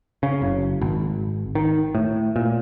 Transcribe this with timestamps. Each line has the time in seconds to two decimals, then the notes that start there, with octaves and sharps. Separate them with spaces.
0.23 C#3
0.42 F#1
0.81 G#1
1.55 D#3
1.95 A2
2.36 A#2